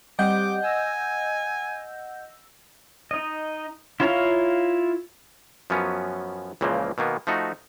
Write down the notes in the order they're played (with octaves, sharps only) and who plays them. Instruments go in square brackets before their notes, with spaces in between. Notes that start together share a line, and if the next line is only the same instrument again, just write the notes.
[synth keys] G3 C4 G4 [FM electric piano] D#5 F#5 G6 [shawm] D6
[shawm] G#5 [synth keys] E6 A#6
[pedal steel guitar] D#4 D#5
E4 F4 C#5 F5 A#5
[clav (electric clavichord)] F#2 F3 F#3 B3 C#4
C#2 A#2 C#3 E3 F3 A#3
B2 D#3 A#3 B3
F3 A3 D#4 F#4